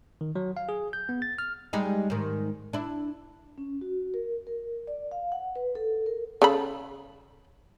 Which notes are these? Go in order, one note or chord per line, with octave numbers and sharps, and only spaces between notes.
D#3
F#3
F5
G#4
G6
B3
A6
F6
G3 G#3 D#4
G#2 D#3
D4 E4
C#4
F#4
A#4
A#4
D5
F5
F#5
B4
A4
A#4
C#3 A4 B5